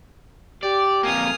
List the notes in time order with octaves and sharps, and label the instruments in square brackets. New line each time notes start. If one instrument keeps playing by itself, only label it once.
[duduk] G4 [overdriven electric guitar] D5
[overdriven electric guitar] F2 A#3 [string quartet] G#5 D#6 F6